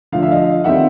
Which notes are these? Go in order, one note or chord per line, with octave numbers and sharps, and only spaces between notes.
D3 F3 A3 F5
E5
D#5 F5
D#3 G3 C4 E5 F#5